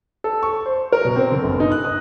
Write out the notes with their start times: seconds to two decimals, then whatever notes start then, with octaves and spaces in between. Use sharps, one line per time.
0.24 A4
0.43 C#6
0.66 C5
0.92 A#4
1.05 B2
1.16 C4
1.32 D3
1.43 G1
1.60 D#4
1.72 F#6
1.84 D#6